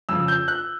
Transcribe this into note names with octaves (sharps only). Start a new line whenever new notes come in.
F2 C#3 F3 E6
G6
F#6